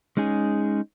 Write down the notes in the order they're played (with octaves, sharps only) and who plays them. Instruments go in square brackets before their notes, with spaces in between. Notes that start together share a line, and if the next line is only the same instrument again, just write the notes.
[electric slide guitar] G#3 C#4 D#4 G#4